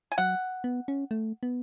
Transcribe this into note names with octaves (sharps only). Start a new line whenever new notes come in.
G#5
F#3 F#5
B3
C#4
A3
B3